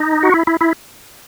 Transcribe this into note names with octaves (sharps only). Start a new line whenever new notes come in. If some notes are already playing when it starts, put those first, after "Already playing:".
Already playing: D#4
F#4
E4
E4
E4